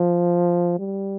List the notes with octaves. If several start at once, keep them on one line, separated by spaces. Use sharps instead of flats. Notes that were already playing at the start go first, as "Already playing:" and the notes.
Already playing: F3
G3